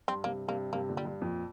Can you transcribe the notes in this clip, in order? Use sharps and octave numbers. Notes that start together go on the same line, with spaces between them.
G2 C4
G2 C3 A#3
G2 C3 A#3
G2 C3 A#3
A#2 D3
G3
G2
F2 A#2